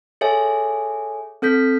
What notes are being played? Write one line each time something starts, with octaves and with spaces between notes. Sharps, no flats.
G#4 A4 C#5 E5 G#5
C4 A4 G6 B6